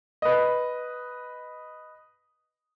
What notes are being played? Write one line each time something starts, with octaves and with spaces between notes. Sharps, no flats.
B4 D#5